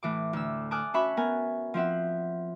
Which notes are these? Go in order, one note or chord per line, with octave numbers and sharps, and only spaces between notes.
A2 E3 D6
D2 E6
G#5 A5 D6 D#6 F6 F#6
C#4 F#4 E5 B5 C#6
B3 A#4 G#5
F3 C4 E5 F#5